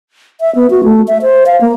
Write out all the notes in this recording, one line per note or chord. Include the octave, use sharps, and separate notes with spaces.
E5
B3
F#4
A3
E5
C5
F5
A#3